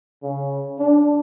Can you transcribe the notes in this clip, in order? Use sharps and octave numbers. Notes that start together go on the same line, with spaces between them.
C#3
D4